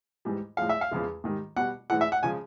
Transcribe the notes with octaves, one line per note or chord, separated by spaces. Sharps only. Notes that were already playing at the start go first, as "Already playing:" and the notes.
G#2 E3 G3
A2 F3 G#3 F5
E5
F5
E2 C#3 F3 G#3
G#2 D#3 G3
B2 G3 F#5
A2 E3 G#3 F#5
E5
F#5
C#3 F3 G#3 G#5